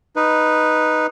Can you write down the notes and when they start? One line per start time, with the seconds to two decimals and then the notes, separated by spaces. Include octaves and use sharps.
0.16 D#4 B4